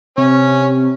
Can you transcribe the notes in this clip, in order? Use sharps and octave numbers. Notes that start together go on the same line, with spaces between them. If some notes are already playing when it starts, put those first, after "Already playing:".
C3 C#4 C#5